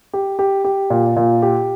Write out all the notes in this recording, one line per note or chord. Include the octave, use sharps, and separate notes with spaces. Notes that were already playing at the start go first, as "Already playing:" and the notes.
G4
G4
G4
A#2
A#2
G4